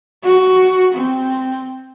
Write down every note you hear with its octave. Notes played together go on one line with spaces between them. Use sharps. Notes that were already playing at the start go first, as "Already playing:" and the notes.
F#4
C4